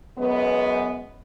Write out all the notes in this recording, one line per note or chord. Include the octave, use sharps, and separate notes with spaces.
F#2 G#3 B3